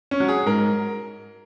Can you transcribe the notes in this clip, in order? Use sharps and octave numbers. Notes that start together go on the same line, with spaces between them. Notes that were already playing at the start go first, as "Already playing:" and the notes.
C#4
F#3
G#4
G#2 A#4